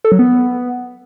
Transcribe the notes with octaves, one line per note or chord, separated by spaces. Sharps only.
A4
F#3
B3